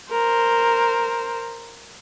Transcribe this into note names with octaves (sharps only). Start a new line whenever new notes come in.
A#4 C5